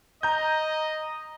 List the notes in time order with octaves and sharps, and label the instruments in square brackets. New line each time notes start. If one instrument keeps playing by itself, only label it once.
[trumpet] D#5 [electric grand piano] A#5 G6